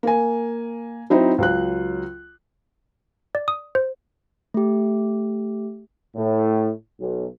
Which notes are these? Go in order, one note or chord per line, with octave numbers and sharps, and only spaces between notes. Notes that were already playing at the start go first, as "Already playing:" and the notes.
A#3 G#5
F#3 C4 D#4 E4 C5
C#2 F#3 F#6
D5
D#6
C5
A3 G4
A2
B1